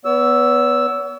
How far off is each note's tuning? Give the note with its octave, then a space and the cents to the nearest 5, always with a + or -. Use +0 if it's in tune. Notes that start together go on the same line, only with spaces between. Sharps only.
B3 +0 C#5 +45 E6 +0